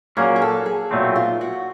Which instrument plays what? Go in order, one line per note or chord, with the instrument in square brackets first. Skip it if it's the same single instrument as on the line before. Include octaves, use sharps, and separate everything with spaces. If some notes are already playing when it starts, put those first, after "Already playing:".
[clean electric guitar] A#2 F#3 A#3 C#4 [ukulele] G#4
[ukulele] G#4
A4
G#4
[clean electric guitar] B1 A#2 F#3 A3 C4
[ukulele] F4
F#4